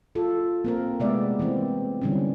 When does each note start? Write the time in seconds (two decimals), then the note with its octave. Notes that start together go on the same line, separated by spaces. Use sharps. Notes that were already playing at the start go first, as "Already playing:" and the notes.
0.15 F4 A4
0.64 A#3 C4 A#4
1.00 C3 G#3 A3 B3 D5 E5
1.39 E3 A#3 C4
2.01 D3 E3 G3 C4 C#4